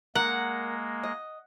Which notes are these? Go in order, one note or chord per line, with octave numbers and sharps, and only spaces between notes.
G#3 A#3 A#4 F#5
D#5